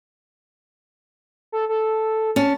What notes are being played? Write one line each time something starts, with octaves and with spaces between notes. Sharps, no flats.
A4
A4
C#4 A5